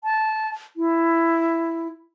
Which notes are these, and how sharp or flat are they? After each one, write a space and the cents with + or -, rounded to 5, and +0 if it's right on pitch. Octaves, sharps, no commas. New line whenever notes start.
A5 -15
E4 +10